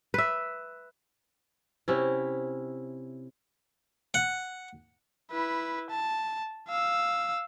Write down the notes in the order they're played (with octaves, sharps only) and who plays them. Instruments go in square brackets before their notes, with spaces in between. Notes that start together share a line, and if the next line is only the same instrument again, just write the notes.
[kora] B4 E5
C3 C#4 E4
[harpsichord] F#5
[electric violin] E4 B4
A5
F5 E6